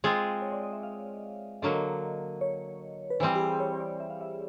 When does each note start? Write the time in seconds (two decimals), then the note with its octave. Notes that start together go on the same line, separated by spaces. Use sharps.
0.04 G#3 C4 F4 G#4
0.42 C#5
0.52 D5
0.63 D#5
0.73 E5
0.83 F5
1.62 D3 F#3 A#3 D#5
2.41 C#5
3.10 B4
3.20 E3 G3 C4 C5
3.35 G4
3.40 G#4
3.60 C#5
3.73 C#5
3.80 D5
4.00 E5
4.10 F5
4.21 E5